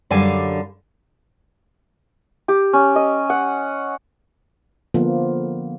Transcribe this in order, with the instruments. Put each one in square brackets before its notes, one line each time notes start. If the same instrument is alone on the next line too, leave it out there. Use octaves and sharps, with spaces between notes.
[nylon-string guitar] F#2 D3 G3 F5 G#5
[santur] G4
C#4
D#5
F#5
[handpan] D3 F3 A#3 B3 F4